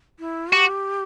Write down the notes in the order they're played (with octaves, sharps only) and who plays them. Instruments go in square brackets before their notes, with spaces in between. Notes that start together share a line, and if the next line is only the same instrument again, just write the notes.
[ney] E4
[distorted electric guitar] F#4 [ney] G4